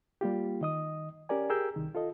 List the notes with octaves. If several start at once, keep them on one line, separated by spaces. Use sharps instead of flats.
G3 A#3 F4 G4
D#3 D#5 D#6
C#4 G4 A#4 D5 G#5
G4 G#4 A#4 E6 G6
C2 D#3
F4 A4 D#5